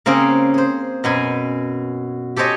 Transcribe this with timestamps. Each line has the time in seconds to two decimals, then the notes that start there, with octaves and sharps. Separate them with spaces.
0.06 C#3 A#3 C4 C#4 G#4
0.54 G#4 C5
1.04 F#2 B2 G#5
2.36 G4 A4 C5 C#5 D#5 G#5